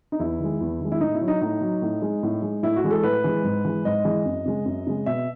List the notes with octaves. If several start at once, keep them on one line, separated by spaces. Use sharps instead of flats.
D#4
E2 E4
D#3 G#3
E2
D#3 G#3
E4
A2 D#4
E4
F#3
D#4
A2 D#4
F#3
A2
G#3
A2
G#3
A2 E4
F#4
E3 G#3
A4
A2 B4
E3 G#3
G#2
E3 G#3
G#2 D#5
E3 G#3
F#2
C#3 G#3
F#2
C#3 G#3
B2 E5